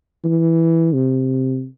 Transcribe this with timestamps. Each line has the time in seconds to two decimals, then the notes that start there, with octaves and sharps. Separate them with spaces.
0.24 E3
0.94 C3